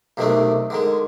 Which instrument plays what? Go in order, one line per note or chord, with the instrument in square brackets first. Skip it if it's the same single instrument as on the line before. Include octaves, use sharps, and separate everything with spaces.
[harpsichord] B1 C3 D#3 A3 D4 D#4
D3 D#3 G#3